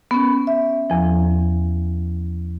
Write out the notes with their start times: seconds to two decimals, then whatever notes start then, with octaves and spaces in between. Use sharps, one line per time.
0.11 B3 C#4
0.47 E5
0.90 E2 F3